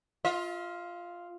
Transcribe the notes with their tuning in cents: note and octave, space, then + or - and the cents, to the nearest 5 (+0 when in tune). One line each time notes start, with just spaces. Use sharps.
F4 +0 E5 -45